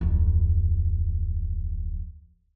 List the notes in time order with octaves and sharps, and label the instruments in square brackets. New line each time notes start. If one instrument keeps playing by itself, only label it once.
[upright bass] D1 F2